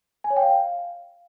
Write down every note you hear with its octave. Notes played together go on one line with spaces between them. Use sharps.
G#5
C#5
G5
F5